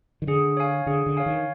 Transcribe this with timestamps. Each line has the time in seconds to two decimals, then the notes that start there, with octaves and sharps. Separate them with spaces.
0.22 D#3
0.27 D3 G#4
0.57 C#5 F5 G#5
0.86 D3 G#4
1.06 D3
1.17 C#5 F5 G#5
1.26 D#3